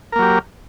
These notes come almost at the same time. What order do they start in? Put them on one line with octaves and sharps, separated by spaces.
A#4 A#3 F#3 G4